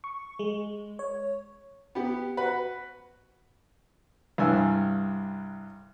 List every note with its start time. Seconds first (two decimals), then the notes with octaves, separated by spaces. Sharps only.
0.04 C#6
0.39 G#3
0.99 C#5
1.95 B3 G4
2.37 F#4 B4
4.38 C2 G2 G#5 E6